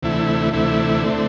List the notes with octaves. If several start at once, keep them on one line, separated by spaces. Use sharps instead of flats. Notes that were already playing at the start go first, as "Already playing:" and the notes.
D2 C3 E3 A3 E4
D2 C3 E3 A3 E4
D3 A3 C4